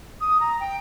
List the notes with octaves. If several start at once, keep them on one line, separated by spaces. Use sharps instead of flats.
D#6
A#5
G5